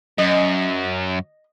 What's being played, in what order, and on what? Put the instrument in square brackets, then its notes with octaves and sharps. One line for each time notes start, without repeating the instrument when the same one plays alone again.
[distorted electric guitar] F#2 [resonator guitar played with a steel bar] D#5